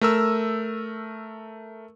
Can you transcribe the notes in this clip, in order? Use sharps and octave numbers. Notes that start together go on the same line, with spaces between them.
A3 A#4 E6